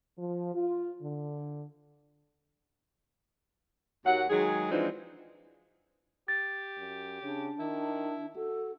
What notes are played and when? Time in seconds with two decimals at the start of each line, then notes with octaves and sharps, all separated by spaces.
0.18 F3
0.55 F4
1.01 D3
4.05 D#2 F#3 F#5
4.30 D#3 F#3 G#3 G#4
4.71 E3 F3 G#3 C4 D4 D#4
6.28 G4 A6
6.78 F#2
7.22 C#3 D4
7.59 D#3 E4
8.36 F#4 A4